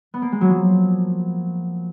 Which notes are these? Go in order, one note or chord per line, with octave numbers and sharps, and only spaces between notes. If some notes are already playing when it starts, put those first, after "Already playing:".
B3
A#3
G#3
F#3
F3